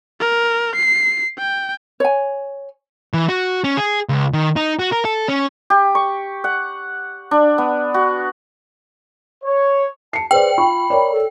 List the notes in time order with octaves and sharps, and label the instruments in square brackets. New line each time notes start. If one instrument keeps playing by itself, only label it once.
[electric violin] A#4
C7
G5
[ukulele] C#5 G#5
[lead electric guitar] E3
F#4
C#4
G#4
C#2
D#3
D#4
F#4
A#4
A4
C#4
[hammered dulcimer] G4
C#6
F#5
D4
B3
F#4
[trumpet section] C#5
[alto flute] A5 [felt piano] C7 C#7
[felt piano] G#4 C5 D5 [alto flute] B4 [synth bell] G5
[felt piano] F4 C#6 [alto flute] B5
[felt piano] A#4 C#5 D5
[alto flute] A4